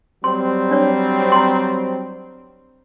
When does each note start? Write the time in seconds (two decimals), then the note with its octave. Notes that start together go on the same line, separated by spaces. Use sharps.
0.24 F#3 G3 C4 C6
0.71 D4 C#5
1.32 A#5 C6